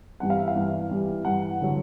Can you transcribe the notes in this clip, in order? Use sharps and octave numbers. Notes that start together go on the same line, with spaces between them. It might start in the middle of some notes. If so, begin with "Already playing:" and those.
G2 E3 G3 F#5
F5
E5
F5
G2 E3 G3
G2 E3 G3
G2 E3 G3 F#5
D3 F#3